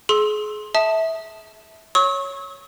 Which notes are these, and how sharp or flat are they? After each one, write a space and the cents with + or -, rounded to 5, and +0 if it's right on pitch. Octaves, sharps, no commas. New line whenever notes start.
G#4 +30 C6 +15 E6 +0
E5 -20 A5 +0 D#6 +0
C#5 +0 C#6 -20 E6 -45